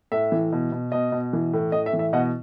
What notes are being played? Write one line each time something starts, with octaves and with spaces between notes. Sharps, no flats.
A2 E5
E3
B2
B2
B2 D#5
B2
E3
A2
A2 D#5
E5
E3
E5
B2 D#5 F#5